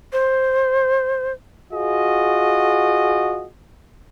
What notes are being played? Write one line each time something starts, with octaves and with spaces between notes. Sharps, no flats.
C5
F4 F#4 G#4 D#5